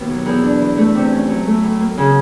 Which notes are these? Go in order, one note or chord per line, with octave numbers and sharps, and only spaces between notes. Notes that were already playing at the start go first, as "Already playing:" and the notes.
Already playing: D#2 B2 A#3
F#3
E2
D4
E3
A3
C3
C#4
F#3
A3
A2
A#3
C#3